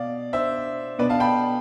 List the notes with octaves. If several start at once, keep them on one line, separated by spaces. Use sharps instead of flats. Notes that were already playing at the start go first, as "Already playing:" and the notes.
Already playing: B2 D5 F5
C5 E5
B2 B4 D5
F5 A5
G5 B5